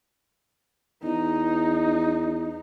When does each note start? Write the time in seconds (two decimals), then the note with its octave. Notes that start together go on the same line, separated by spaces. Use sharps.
1.03 E2 D#4